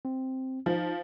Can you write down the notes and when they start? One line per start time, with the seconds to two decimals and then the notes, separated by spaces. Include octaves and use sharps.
0.05 C4
0.66 F3 D#4